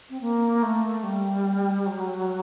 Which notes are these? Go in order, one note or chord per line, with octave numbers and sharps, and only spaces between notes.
C4
A#3
A3
G3
F#3